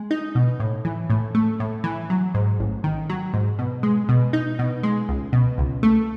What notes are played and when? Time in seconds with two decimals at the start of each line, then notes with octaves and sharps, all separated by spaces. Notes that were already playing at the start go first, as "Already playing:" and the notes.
Already playing: G#3
0.11 D#4
0.35 B2
0.60 A2
0.85 E3
1.10 A2
1.35 A3
1.60 A2
1.84 E3
2.10 F#3
2.34 G#2
2.60 A1
2.84 D#3
3.10 F#3
3.34 G#2
3.59 B2
3.83 G#3
4.09 B2
4.33 D#4
4.59 B2
4.83 G#3
5.09 C#2
5.33 B2
5.58 C#2
5.83 A3